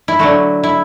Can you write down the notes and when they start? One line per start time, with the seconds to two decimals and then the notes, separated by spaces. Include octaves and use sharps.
0.08 E4
0.19 D3 F#3 A3 F#4
0.63 E4